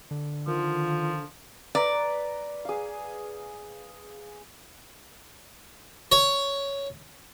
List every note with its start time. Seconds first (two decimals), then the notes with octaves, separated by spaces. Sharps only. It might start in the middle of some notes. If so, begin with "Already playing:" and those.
0.11 D3
0.47 D#3 F3 F4
1.75 B4 D5 A#5
2.65 G#4 F5
6.12 C#5